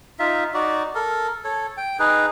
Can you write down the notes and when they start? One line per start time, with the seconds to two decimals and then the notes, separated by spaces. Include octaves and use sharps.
0.19 D#4 F4 E5
0.54 D#4 F#4 D5
0.95 A4 A#4
1.44 A4 C#5
1.77 G5
1.99 D#4 G#4 B4